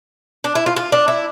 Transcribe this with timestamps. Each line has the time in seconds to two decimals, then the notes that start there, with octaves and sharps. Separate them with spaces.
0.44 D4
0.55 E4
0.66 F4
0.76 F4
0.92 D4
1.08 E4